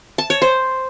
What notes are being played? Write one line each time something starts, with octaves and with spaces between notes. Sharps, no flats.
A5
C#5
C5